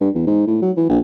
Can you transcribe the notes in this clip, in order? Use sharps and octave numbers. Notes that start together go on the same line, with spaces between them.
G2
E2
G#2
A2
F#3
E3
A#1